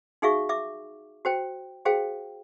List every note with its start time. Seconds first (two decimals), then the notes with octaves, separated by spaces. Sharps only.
0.22 D#4 F#4 G#4 E5 F5 C#6
0.49 E5 D6
1.25 F#4 C5 G5
1.85 F#4 G#4 C5 F5 G5